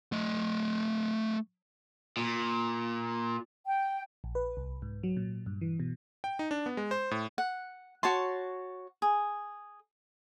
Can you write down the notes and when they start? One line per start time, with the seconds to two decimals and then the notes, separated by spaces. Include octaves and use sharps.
0.12 A3 D#5
2.17 A#2
3.66 G5
4.24 A#1
4.35 B4
4.57 C2
4.82 G#2
5.03 F#3
5.17 A#2
5.46 G2
5.61 E3
5.80 B2
6.24 G5
6.39 D#4
6.51 D4
6.66 B3
6.77 G#3
6.91 C5
7.11 A2
7.38 F#5
8.03 F#4 C#5 A5 C6
9.02 G#4